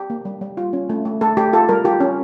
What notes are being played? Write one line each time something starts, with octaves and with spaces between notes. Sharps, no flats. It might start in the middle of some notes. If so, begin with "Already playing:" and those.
Already playing: G4
A#3
G3
G3
F4
C#4
A3
A3
A3 A4
A3 G4
F4 A4
G3 A#4
F4 G4
C#4